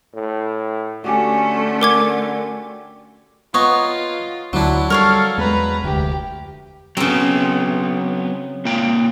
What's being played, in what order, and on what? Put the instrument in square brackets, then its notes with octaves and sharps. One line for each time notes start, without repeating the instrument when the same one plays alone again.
[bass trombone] A2
[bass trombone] D3 [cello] A3 C#4 [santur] F#4 G4 G#5
[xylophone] A#4 D6 G#6
[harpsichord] B3 [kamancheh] F4 [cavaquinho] C#5 D#5 A#5
[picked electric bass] D2 [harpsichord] F#3 D4 [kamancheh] E4
[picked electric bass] G3 [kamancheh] A4 [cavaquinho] A#4 C#5 F5
[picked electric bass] E2 G#3 [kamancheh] B4 A#5
[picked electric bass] F1 D2 [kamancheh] G4
[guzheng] C#3 C4 [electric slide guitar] F#3 B3
[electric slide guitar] A#3 F4 G5